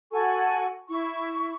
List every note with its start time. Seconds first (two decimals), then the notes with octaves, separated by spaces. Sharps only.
0.12 F#4 A4 G#5 C#6
0.88 E4 C#6